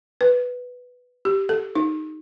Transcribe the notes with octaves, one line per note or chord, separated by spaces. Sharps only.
B4
G4
A4
D#4